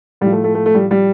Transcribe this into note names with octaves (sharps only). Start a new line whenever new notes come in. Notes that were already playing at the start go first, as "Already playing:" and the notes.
A2 F3 G3
A3
A3
A3
A3
G3
G3